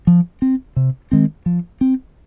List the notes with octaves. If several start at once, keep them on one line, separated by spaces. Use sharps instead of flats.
F3
C4
C3
D#3 G#3 C4
F3
C4